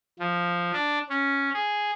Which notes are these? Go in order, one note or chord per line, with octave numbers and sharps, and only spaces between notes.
F3
D4
C#4
G#4